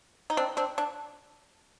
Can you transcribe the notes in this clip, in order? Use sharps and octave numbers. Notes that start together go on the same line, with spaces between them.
D#4
C4 D4
C4 D4
D4